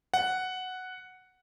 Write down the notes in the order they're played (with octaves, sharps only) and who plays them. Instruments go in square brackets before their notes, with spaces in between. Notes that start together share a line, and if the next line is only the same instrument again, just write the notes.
[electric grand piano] F#5